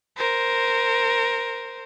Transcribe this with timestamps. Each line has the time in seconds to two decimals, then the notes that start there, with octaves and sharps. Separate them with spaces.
0.17 A#4 C5